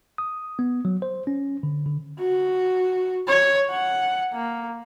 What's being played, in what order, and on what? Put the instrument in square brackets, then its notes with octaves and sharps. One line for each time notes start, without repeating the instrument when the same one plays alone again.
[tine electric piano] D#6
B3
F#3
C5
C#4
D3
D3
[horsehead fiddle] F#4
C#5
F#5
A#3